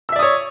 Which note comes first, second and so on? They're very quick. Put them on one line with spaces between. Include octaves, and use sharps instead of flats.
E6 E5 D5 D#6 C#5